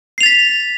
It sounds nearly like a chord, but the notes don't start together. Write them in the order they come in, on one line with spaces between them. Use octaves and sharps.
C7 F7 A6 B6